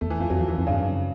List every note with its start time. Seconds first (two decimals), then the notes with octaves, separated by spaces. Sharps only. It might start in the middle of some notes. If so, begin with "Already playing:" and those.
0.01 E2 A3
0.10 E3
0.20 F2 F3
0.30 F2 F#3
0.39 E2 F3
0.48 E3
0.58 F2 D#3
0.67 G2 C#3
0.77 F#2